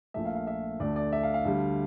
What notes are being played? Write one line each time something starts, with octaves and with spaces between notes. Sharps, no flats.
A#1 A#2 A3 E5
F5
F5
E5
D2 D3 A3 D5
D5
E5
F5
F5
D2 D3 G3